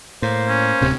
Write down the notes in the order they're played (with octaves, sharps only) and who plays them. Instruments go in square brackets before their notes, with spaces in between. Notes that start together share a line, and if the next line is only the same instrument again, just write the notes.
[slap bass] A2 [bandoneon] A#3 C5
[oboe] C#4
[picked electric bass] D1 C3